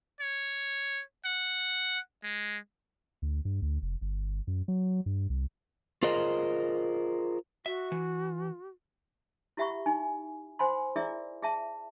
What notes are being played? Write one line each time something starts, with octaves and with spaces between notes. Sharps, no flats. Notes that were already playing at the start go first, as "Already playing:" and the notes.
C#5
F#5
G#3
D2
G2
D2
F1
G1
F#2
F#3
G2
C2
F4 G#4 A#4 C5 D#5
F#4 E5
E3
E4 G4 E5 F#5 B5 C#6
D#4 G#5
C5 F#5 G#5 B5 C6
E4 G#4 A#4 D5 E5
G#4 E5 A5